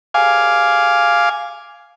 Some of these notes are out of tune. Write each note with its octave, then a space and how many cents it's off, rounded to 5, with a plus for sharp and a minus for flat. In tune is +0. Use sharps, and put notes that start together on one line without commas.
F5 +0 G#5 +5 D6 -5